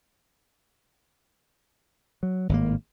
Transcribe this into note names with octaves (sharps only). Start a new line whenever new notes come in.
F#3
G#1 A2 C3 A#3